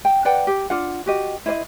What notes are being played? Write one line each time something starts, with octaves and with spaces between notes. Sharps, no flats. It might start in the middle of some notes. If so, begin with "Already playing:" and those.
G5
B4 D5 F#5 G5
G4
D4 F4 F#5
F#4 G4 D#5
E4 C5 D5 D#5